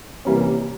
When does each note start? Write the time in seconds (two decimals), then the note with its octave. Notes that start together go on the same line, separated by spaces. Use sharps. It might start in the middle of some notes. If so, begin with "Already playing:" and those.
0.25 C3 E3 G3 A#3 C#4